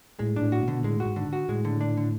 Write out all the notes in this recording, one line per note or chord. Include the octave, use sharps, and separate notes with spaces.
A2 G#3
D4
A2
F#4
B2 D3
A2 G#3
F#4
G#2
D3
F#4
A2 G#3
D3
D4
D3